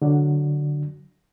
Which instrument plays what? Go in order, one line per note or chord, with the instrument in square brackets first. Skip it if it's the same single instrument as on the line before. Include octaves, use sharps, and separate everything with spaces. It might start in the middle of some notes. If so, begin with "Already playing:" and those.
[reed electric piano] D3 F#3 D4